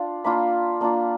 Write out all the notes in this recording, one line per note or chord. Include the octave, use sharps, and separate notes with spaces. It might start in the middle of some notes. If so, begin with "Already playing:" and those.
Already playing: D4 F4
A#3 D4 F4 B5
A#3 D4 F4